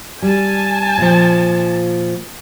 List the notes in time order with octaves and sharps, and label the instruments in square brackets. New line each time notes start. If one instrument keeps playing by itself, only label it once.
[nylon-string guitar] G3 [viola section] G#5 A5
[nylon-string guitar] A#2 F3